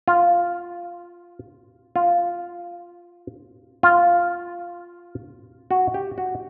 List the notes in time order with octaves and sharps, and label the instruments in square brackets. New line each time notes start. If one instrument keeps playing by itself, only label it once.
[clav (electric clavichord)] F4
F4
F4
F#4
G4
F#4